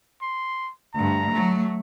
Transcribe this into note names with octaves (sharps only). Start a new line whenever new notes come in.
C6
D2 G2 A#5
F#3 A3